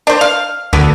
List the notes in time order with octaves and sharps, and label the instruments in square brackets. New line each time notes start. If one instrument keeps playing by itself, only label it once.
[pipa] D4 C5
F5
[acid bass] D2 [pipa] D3 B3